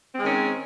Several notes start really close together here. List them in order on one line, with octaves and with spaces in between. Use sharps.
C4 G#3 D#3 C#4